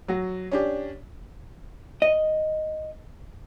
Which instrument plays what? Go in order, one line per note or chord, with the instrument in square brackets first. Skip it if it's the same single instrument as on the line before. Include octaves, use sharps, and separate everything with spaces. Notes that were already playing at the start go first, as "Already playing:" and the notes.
[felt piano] F#3 F#4
C#4 D4 G4
[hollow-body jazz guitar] D#5